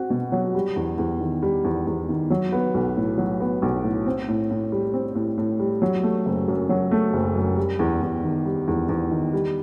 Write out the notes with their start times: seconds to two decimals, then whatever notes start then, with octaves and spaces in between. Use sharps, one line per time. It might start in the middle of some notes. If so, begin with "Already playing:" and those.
Already playing: C4 F#4
0.10 B2
0.32 F#3
0.55 G3
0.76 E2
0.98 E2
1.20 D#3
1.42 G3
1.64 E2
1.87 E2
2.09 D#3
2.30 F#3
2.52 B3
2.74 B1
2.97 A2
3.18 F#3
3.40 B3
3.62 B1
3.84 A2
4.06 C4
4.28 A2
4.50 A2
4.72 G3
4.93 C4
5.15 A2
5.37 A2
5.59 G3
5.82 F#3
6.03 A3
6.26 F#1
6.48 F#2
6.69 F#3
6.91 A3
7.13 F#1
7.36 F#2
7.57 G3
7.79 E2
8.02 E2
8.24 D#3
8.45 G3
8.68 E2
8.89 E2
9.11 D#3
9.33 G3